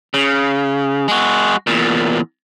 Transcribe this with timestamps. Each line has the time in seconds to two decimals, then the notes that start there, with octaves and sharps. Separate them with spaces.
0.14 C#3
1.08 G#3 F#4
1.67 E2 A#2